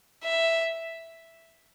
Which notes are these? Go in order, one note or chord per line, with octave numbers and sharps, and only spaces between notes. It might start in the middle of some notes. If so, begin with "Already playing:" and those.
E5